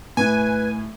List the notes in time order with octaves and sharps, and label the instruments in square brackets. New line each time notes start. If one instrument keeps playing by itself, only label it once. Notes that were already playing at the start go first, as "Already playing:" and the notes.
[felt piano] A2 [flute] B4 [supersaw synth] G#5